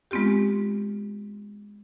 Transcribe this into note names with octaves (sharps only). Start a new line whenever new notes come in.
G#3 B3 C4 F4 G4